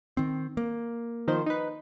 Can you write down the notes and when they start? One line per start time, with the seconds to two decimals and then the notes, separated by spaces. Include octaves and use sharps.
0.17 D#3 C4
0.57 A#3
1.28 D#3 F3 C5
1.46 D#4 B4